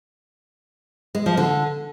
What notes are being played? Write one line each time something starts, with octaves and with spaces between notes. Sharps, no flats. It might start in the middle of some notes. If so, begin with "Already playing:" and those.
G#3
F3
D3